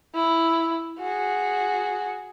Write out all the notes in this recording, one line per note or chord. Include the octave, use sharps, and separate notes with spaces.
E4
F#4 G#4